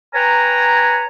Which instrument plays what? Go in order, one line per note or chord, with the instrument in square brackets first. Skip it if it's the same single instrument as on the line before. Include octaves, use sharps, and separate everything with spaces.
[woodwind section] B4 C#5 G5 G#5 A#5